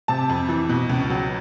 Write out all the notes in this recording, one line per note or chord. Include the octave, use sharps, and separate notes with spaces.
C3 A5
F2
E3
B2
C#2
F#3